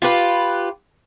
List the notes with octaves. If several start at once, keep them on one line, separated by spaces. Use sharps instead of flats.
F4 G4 B4